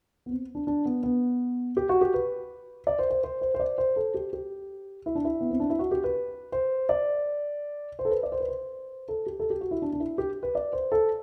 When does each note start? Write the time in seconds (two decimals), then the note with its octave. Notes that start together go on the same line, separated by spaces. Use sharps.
0.26 B3
0.30 C4
0.55 D4
0.67 D4
0.85 B3
1.03 B3
1.77 G4
1.89 F#4
2.01 G4
2.14 B4
2.87 D5
2.99 C5
3.10 C5
3.24 C5
3.41 C5
3.54 C5
3.60 D5
3.78 C5
3.96 A4
4.14 G4
4.33 G4
5.06 E4
5.15 D4
5.25 E4
5.41 B3
5.51 C4
5.60 D4
5.70 E4
5.79 F#4
5.91 G4
6.04 B4
6.52 C5
6.89 D5
7.99 C5
8.05 A4
8.11 B4
8.23 D5
8.32 C5
8.40 B4
8.48 C5
9.08 A4
9.26 G4
9.40 A4
9.50 G4
9.61 F#4
9.71 E4
9.82 D4
9.93 D4
10.00 E4
10.18 G4
10.43 B4
10.55 D5
10.73 C5
10.92 A4